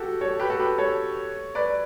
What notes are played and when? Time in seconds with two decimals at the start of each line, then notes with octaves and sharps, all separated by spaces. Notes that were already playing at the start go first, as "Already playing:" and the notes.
Already playing: F#4 G4 A4
0.21 A4 C#5
0.40 G4 B4
0.50 F#4 A4
0.60 G4 B4
0.78 A4 C#5
1.55 B4 D5